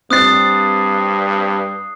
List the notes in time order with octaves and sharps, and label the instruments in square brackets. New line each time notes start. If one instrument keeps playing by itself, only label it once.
[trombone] G2 [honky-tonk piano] C4 A6 [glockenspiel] D#6 F#6 C7